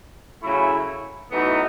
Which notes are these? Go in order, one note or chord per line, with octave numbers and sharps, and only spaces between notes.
C#3 F#3 A3 E4
A2 E3 B3 D#4 F#4